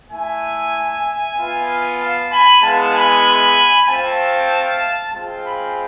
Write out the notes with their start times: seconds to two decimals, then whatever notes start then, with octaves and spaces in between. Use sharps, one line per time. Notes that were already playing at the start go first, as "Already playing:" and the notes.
0.10 A3 E4 E5 G#5
1.36 B3 F4
1.99 F5 A5
2.30 G#5 B5
2.62 G#3 B3 E4 F5 A5
2.94 G#5 B5
3.87 A3 C4 F4 F5 A5
5.13 G#3 C4 F4 F5 A5
5.45 G#5 B5